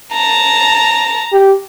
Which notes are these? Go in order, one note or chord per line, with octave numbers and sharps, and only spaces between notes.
A5 A#5
G4